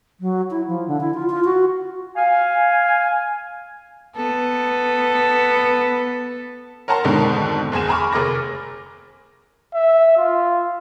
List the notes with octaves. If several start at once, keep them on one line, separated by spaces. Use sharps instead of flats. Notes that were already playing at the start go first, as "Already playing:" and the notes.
F#3
E4
F3
D3
E4
F4
F4
F#4
F5 G#5
B3 A4
A#4 C#5 F#5 A5 A#5 C6
F2 G#2 B2 D3 D#3
F#1 E2 G#4 G#5 E7
G#5 A#5 B5 C#6 D6 F6
F1 G#4 A#4 D6 A#6
E5
F4